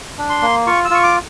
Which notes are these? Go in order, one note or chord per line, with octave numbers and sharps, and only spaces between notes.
D4
C6
A#3
F4 C#6
E6
F4 C#6
D6